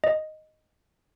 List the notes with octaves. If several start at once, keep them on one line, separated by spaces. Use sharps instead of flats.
D#5